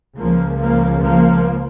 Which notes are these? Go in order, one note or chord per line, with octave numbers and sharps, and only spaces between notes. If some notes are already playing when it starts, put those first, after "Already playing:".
C#2 C#3 F3 A#3
F3 A#3
F3 A#3